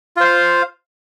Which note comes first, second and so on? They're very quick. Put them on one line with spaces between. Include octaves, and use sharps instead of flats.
F4 C5 F5